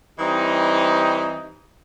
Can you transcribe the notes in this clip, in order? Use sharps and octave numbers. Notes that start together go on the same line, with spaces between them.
E3 G3 C4 D#4